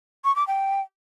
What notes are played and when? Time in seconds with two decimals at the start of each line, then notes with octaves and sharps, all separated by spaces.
0.24 C#6
0.36 D6
0.47 G5